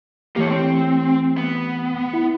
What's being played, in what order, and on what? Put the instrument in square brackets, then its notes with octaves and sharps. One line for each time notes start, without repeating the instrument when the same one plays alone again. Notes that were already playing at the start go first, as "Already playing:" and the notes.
[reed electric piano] E3 A3 G4 [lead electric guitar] A#3 C#5
[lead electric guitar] C4
B3
[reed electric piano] E4